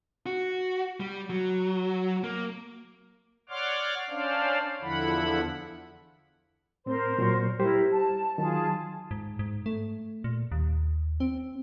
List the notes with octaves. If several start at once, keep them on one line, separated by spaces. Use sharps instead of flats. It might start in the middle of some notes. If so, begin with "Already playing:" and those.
F#4
G3
F#3
A#3
C#5 D5 F#5 C6 D6 F6
C#4 D4 C5 D5 F5
E2 D3 F3 E4 F#5 B5
A2 C4 A#4 C5 C6
A#2 F#3 C#6
G3 E4 G4 A#4 C5
A5
D#3 F#3 F4 G#4 A5
G#2
G#2
A3
A#2
D#2
C4